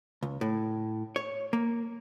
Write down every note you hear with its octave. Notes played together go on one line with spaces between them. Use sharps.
C#2
A2
C#5
A#3